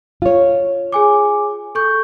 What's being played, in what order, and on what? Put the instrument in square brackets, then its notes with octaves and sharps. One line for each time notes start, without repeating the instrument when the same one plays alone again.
[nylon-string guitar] F4 C#5
[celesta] G#4 G#5 D6
A4 C#6 G6